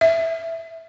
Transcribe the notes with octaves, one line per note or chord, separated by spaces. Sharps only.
E5